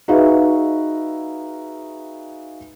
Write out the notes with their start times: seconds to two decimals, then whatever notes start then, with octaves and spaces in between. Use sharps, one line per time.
0.08 D#4 F#4 G#4 B4 E5 F5